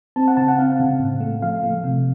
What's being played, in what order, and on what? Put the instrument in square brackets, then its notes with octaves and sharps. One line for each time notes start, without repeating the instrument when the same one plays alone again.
[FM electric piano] C4 A5
F#5
C#3 A5
F#5
C4 F5
C#3
A2
A3
F3 F5
A3
C3